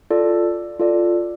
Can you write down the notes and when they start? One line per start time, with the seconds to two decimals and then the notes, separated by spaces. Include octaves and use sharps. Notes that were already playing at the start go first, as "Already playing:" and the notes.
0.10 F4 A4 D5
0.79 F4 A4 D5